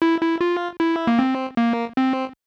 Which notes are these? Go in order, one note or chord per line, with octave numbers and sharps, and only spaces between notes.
E4
E4
F4
E4
A#3
C4
A#3
C4